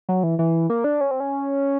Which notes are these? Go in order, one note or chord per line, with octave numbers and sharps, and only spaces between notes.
F#3
E3
E3
A#3
D4
C#4
C4
C#4